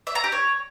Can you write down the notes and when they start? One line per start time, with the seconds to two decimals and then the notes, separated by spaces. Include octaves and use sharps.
0.07 E5
0.15 A#5
0.24 G4
0.32 C#5